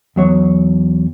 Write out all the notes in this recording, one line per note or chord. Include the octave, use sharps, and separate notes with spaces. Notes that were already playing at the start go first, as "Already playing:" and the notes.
E2 F#3 C#5